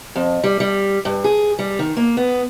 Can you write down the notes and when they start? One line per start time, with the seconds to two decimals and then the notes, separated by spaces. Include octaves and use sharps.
0.16 F2
0.44 G3
0.60 G3
1.05 G2
1.24 G#4
1.59 G3
1.79 D#3
1.97 A#3
2.17 B3